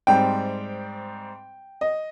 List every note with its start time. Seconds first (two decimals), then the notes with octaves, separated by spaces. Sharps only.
0.07 G#2 G3 C4 G5
1.81 D#5